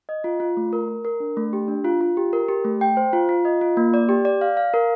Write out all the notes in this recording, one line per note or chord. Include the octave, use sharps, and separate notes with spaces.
D#5
F4
F4
A3
A#4
A#4
A#4
D4
A3
G4
D4
F4
F4
G4
A#4
G4
A3
G5
C5
F4
F4
D#5
F4
A#3
D5
G4
D5
F5
F5
A#4